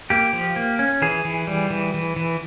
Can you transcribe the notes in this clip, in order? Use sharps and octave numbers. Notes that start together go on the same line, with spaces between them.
A#3 G4
F3
A#3
C#4
E3 G#4
E3
G3
E3
E3
E3